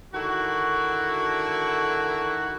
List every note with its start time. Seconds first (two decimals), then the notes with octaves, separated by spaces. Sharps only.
0.14 D3 D#3 E4 F#4